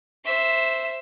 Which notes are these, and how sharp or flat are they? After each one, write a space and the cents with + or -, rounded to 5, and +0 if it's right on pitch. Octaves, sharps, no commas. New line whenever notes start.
C5 +0 E5 +0